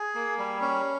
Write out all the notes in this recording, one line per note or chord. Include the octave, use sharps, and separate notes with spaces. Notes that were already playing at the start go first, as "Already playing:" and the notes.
Already playing: G#4
A#3
G3
C#4